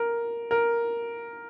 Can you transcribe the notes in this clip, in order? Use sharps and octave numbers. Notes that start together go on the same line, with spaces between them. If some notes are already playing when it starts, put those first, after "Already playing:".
Already playing: A#4
A#4